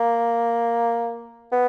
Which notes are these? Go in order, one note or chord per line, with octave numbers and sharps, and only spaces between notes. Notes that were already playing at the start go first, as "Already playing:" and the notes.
Already playing: A#3
B3